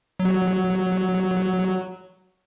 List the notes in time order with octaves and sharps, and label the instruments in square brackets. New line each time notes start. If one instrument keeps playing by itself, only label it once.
[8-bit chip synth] F#3